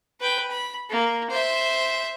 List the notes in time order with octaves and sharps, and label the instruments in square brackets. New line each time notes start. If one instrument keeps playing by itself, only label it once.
[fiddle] B4 G5
B5
A#3
C5 E5